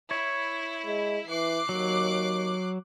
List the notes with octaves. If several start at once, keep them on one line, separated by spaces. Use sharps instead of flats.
E4 C#5
G#3
E3 D6 F#6 C7
D#2 F#3